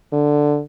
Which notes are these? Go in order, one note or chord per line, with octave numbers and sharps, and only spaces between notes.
D3